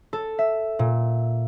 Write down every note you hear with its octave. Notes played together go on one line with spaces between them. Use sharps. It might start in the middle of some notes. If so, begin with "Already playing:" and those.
A4
E5
A#2